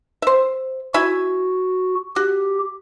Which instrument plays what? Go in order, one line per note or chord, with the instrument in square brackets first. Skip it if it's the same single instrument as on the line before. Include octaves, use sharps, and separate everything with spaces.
[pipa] C5 E5
[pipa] E4 E5 G#5 [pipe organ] F#4
[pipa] F#4 [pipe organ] G4